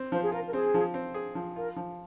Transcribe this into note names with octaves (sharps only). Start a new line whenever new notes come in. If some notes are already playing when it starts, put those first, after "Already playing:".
Already playing: C4
F3 C5
G#4
F4 A#4
A#4
C4 G#4
F3
C4
G#4
F3
F4 A#4
F3